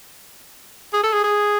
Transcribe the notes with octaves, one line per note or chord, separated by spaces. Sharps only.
G#4
A4
G#4
G#4